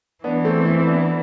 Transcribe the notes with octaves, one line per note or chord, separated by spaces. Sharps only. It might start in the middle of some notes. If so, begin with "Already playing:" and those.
E3 B3 D4
A3 C4
C4 E4
E4
B3 D4